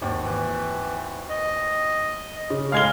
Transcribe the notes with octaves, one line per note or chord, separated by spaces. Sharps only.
G#1 D#2
E3
D#5
C#3
A2 G#3 F5 F6 G#6 G7